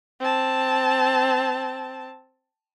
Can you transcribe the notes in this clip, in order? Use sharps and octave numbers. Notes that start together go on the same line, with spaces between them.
C4 A5